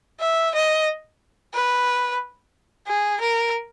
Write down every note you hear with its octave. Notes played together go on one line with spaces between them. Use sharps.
E5
D#5
B4
G#4
A#4